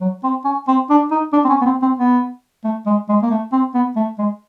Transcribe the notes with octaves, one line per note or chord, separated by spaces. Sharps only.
F#3
C4
C#4
C4
D4
D#4
D4
C4
C#4
B3
C4
C4
B3
A3
G#3
G#3
A#3
A3
C4
B3
A3
G#3